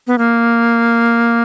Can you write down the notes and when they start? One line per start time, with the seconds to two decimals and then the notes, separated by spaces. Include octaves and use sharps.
0.07 B3
0.18 A#3